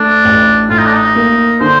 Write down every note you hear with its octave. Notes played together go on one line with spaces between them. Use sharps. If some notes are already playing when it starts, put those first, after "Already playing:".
Already playing: A3 D4
A1
A2 F4
D#4
D4
D#4
A#3
D3 C5